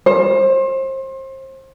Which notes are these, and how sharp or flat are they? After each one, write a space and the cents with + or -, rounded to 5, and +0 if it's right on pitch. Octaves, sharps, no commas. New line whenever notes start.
C5 +30